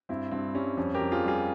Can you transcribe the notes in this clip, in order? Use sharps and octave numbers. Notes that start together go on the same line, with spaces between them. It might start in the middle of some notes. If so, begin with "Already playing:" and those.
G2 C4 E4
G2 C4
G3 C#4
F2 C#4
G4 A#4
F2
F4 G#4
G3 F4 G#4